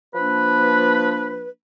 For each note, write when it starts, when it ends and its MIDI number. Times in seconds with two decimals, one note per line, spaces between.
0.15 1.49 53
0.15 1.49 58
0.15 1.49 62
0.15 1.49 71